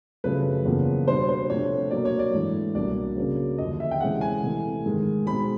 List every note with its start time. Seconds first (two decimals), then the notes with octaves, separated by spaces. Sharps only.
0.24 F#2 C#3 F3 A3 B4
0.65 E2 C#3 F3 A#3
1.07 B2 G3 B3 D4 C5
1.29 C5
1.49 C3 F3 A3 D4 C#5
1.91 B2 F#3 A#3 D5
2.05 C#5
2.19 D5
2.34 G#2 E3 A3 D4
2.75 C2 B2 F#3 A#3 D4 D5
3.17 C#3 F#3 A#3 C#4
3.58 D#2 D3 F3 D#5
3.80 E5
3.91 G5
4.00 C3 E3 G#3 C#4 F#5
4.21 G#5
4.42 C3 E3 A3
4.85 G#2 D#3 G#3
5.26 B2 G#3 C4 D#4 B5